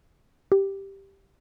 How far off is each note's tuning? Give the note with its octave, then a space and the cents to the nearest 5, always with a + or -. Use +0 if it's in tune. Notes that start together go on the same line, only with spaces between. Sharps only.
G4 +0